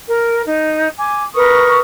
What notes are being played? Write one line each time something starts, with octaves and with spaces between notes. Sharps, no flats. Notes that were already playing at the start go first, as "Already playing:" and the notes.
A#4
D#4
G#5 D6
A#4 B4 C#6 D#6